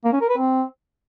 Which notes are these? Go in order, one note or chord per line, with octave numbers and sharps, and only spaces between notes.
A#3
C#4
A#4
B4
C4